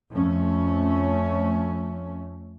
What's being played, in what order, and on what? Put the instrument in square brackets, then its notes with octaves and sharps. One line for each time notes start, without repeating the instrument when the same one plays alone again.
[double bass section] F2 A3 C#4